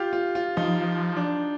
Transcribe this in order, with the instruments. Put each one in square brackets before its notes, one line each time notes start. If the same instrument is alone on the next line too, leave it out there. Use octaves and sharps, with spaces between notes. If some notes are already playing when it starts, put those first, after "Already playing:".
Already playing: [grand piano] F4 G4
F4
F4
[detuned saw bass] F3 [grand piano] D#4
[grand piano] D4